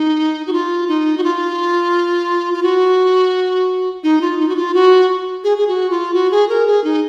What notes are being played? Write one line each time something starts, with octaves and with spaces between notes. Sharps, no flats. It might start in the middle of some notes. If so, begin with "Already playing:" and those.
Already playing: D#4
F#4
F4
D#4
F#4
F4
F4
F#4
D#4
F4
D#4
F#4
F4
F#4
G#4
G#4
F#4
F4
F#4
G#4
A#4
G#4
D#4